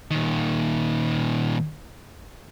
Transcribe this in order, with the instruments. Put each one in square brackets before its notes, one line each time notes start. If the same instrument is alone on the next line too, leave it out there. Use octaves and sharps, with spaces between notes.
[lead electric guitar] A#2 D#3